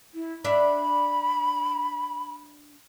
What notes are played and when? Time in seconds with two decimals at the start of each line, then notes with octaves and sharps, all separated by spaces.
0.15 E4
0.44 D4 E5 B5